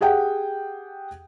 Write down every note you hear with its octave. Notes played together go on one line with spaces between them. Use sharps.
G4 G#4 F#5 G5